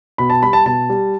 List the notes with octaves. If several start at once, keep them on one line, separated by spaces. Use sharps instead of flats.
B2 B5
A5
G3 B5
A5
B2 A5
G3